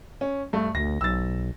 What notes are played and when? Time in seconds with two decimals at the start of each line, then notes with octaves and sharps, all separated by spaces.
0.21 C#4
0.53 G2 A3
0.75 D2 A#6
1.01 B1 E6 A6